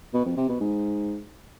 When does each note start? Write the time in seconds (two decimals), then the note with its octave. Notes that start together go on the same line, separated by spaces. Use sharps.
0.14 B2
0.25 F2
0.37 C3
0.49 B2
0.60 G#2